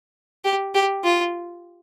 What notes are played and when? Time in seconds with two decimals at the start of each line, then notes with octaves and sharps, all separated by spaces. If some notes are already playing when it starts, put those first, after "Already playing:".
0.45 G4
0.74 G4
1.04 F4